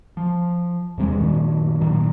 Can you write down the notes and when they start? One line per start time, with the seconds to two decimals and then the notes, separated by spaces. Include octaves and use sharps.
0.17 F3
0.98 E2 C3 G3 G#3
1.19 F#2 A#2 D#3
1.80 A#2 D#3 F#3